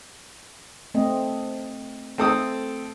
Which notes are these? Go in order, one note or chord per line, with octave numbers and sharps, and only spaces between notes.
A3 C4 D#5
A3 C4 A4 D#6